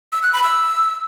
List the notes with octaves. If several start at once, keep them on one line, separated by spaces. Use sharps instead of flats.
E6
F#6
B5
E6